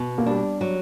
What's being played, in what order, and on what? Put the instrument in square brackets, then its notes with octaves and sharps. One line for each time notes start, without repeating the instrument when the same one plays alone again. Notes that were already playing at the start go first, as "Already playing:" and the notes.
Already playing: [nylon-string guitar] B2
[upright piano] A#3
[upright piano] G3 [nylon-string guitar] D4
[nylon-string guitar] F#3